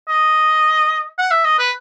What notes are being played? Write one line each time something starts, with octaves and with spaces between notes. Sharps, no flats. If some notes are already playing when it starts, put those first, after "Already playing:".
D#5
F#5
E5
D#5
B4